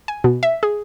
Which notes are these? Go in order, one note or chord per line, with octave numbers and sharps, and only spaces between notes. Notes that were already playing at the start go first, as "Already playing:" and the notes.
G#5
B2
E5
G#4